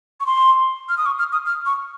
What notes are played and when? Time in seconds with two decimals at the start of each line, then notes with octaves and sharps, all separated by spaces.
0.20 C#6
0.26 C6
0.89 F6
0.97 D#6
1.06 C#6
1.19 F6
1.32 D#6
1.46 F6
1.66 C#6